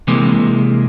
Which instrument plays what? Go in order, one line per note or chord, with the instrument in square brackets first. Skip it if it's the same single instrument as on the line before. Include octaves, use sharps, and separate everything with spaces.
[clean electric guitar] C3 E3 G#3 A#3